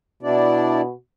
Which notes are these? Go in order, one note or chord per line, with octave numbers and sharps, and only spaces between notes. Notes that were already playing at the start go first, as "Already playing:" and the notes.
B2 D4 E4 D5